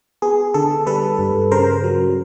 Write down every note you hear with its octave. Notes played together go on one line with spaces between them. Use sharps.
B3 G#4
D3 A4
G3 A4 B4
G2
C#3 A#4 C5
F#3